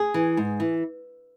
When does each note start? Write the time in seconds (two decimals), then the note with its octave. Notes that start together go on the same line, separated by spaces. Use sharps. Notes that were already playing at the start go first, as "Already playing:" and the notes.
Already playing: G#4
0.14 E3
0.37 G#2
0.60 E3